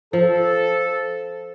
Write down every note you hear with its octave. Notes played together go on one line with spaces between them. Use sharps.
F3 A4